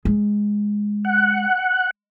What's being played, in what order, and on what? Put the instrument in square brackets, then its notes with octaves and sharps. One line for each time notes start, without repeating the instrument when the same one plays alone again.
[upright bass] G#3
[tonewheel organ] F#5